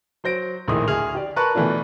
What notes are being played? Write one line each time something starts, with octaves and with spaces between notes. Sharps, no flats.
F#3 C5 A#6 D7
A#1 A2 D#3 G#4 D#6
D2 G#4 F6 F7
G4 D5
A#4 B4 A5 C#6 F#6
B2 D3 E3 A3 D4 F4